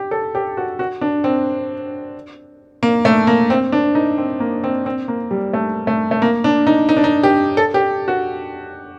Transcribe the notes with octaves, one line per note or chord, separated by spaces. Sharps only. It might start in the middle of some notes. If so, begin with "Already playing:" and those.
Already playing: G4
A4
G4
F#4
F#4
D4
C4
A#3
A3
A#3
C4
D4
D#4
C4
A#3
C4
C4
A#3
G3
A3
A3
A3
A#3
D4
D#4
D#4
D4
D#4
G4
A4
G4
F#4